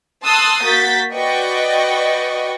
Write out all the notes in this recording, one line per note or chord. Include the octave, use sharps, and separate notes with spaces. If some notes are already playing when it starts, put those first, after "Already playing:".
A5 C6 D#6 E6 F#6 A6
A#3 F#4 G6 A6 B6
F#4 B4 D5 D#5 G5 C#6